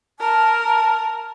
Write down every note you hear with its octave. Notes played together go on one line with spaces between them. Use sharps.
A#4 A5